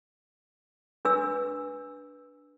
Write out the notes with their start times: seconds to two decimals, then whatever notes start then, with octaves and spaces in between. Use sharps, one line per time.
1.05 D4 B4 E6